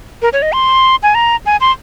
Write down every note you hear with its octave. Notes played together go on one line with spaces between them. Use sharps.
A#4
C#5
D#5
C6
G#5
A#5
G#5
C6